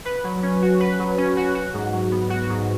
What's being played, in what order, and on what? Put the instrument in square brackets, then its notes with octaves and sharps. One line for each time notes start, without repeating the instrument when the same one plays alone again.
[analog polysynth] B4
F#3
C#4
F#4
B4
F#3
C#4
F#4
F#4
G#2
F#3
B3
F#4
G#2